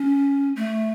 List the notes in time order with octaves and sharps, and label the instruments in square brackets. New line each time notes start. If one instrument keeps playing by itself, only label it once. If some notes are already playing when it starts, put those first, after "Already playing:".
Already playing: [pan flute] C#4
A3